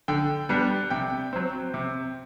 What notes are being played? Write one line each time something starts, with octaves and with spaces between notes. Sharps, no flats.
D3 G5
G3 B3 D4
C3 G5
F#3 C4
C3